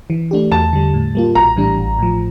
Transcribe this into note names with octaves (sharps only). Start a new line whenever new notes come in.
E3
A3 D4 G4
E2 A5
D3 G3
A2
G3 A#3 F4
A#1 A#5
A2 E3 G3 D4
A1
A2 F3